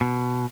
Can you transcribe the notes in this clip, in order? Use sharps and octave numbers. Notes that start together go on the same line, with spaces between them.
B2